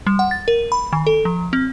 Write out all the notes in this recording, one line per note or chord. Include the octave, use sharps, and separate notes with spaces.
G3
F#5
A6
A#4
B5
D#3
A4
F3
C4